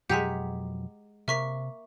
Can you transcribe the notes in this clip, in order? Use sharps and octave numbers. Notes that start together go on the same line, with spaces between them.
F2 B2 F#3 G#3 G4 F#5 A#5 B6
C3 A#3 E5 C#6 B6